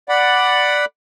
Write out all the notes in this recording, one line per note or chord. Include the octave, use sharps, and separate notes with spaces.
D5 F#5 B5